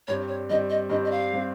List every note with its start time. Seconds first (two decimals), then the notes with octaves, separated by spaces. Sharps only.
0.08 G2 G3 C4 C#5
0.28 C#5
0.49 G2 G3 C4 D#5
0.70 D#5
0.90 G2 G3 C4 D#5
1.05 D#5
1.11 F5
1.33 G3 C4